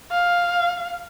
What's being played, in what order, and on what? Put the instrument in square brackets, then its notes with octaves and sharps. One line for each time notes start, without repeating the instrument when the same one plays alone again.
[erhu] F5